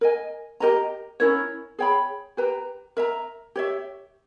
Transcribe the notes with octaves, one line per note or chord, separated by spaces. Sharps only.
A#4 D#5 G#5
G4 A#4 D#5 A#5
C#4 E4 A#4 C#5
G#4 C#5 G5 B5
G4 B4 G5 A#5
A#4 E5 A#5
G4 C#5 E5